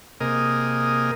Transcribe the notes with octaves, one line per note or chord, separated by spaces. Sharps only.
C3 A#3 G#4 A#4 D#5